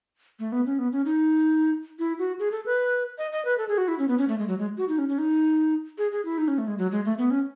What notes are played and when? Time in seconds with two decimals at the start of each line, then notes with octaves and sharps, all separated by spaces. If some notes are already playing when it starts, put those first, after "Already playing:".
0.39 A3
0.52 B3
0.66 C#4
0.79 B3
0.92 C#4
1.05 D#4
1.99 E4
2.19 F#4
2.39 G#4
2.52 A4
2.66 B4
3.18 D#5
3.32 D#5
3.45 B4
3.58 A4
3.69 G#4
3.78 F#4
3.88 E4
3.99 C#4
4.08 B3
4.18 C#4
4.28 A3
4.39 G#3
4.48 F#3
4.59 G#3
4.78 F#4
4.89 D#4
4.98 C#4
5.09 C#4
5.18 D#4
5.98 G#4
6.12 G#4
6.25 E4
6.38 D#4
6.48 C#4
6.58 A3
6.68 G#3
6.78 F#3
6.92 G#3
7.05 A3
7.18 B3
7.31 C#4